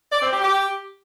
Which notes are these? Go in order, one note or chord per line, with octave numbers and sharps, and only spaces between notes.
D5
C4
G4
G4